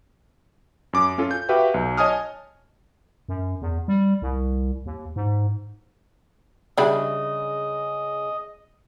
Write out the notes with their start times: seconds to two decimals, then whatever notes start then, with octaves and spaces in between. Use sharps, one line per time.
0.93 F#2 D6
1.18 C#4 F4 A4
1.31 G6
1.49 F#4 G4 B4 E5 F5 G5
1.74 B1
1.97 C#5 D#5 G#5 A5 D#6 F6
3.29 F#2
3.61 E2
3.88 G3
4.22 C2
4.86 D#2
5.16 G#2
6.78 C#3 G3 D4 E4 D#5